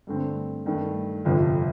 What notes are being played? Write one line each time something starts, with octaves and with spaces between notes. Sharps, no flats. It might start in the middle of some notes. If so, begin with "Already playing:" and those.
G2 D3 A3 C4
G2 D#3 A3
G1 F2 C3 F3